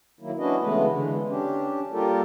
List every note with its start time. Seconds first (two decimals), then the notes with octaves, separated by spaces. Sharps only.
0.21 D#3 F#3 A#3 E4
0.38 C#4 D4 E4 F#4 B4 D#5
0.61 C#3 E3 G#3 A3 B3 B4
0.88 D3 E3 G#3
1.29 C#4 D4 G4
1.92 G3 A#3 F4 G4 A4 A#4